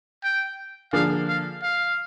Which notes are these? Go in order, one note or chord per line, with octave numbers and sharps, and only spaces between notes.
G5
D3 F3 A#3 D4 G#4 F5
F5
F5